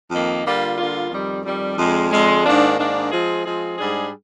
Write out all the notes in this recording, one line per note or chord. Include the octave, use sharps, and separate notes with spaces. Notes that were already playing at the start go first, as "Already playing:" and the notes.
F2 D#3 A#3
D3 G3 A#3 F4
D3 G3 A#3 F4
F2 D#3 G3
F2 D#3 G3
F2 D3 G#3
F2 D3 G#3
G#2 D#3 A#3 D4
G#2 D#3 A#3 D4
F3 G#3 C4 F4 G#4
F3 G#3 C4 F4 G#4
G#2 G3 D4 G#4